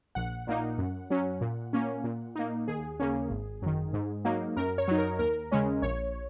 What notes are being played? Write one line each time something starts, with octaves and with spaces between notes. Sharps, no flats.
A#1 F#5
A#2 A#3 D#4
F#2
F#3 C#4
A#2
A#3 C#4
A#2
A#3 D#4
D#2 G#4
C#3 A#3 C#4
G#1
F#2 D#3
G#2
F#3 A#3 D#4
F#2 A#4
C#5
F#3 D#4
A#4
D#2 A#4
C#3 G#3 C#4
A#1 C#5